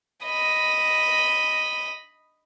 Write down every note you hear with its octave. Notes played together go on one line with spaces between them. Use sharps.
D#5 B5